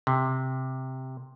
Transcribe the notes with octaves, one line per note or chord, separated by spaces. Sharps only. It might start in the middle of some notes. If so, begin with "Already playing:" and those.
C3